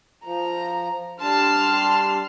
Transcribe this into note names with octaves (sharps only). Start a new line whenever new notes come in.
F3 A#5
G3 D4 A5 C6 F6